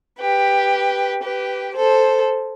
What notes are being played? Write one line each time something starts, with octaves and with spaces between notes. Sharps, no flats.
G4 B4
G4 B4
A4 C5